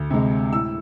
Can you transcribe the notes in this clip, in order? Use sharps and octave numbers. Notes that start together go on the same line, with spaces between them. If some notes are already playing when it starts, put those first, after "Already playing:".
Already playing: D2
C3 G#3
A2 E6